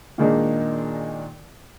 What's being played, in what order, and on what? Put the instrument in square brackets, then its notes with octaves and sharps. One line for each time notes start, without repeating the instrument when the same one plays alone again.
[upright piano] A#2 D#3 G#3 A#3 D4 D#4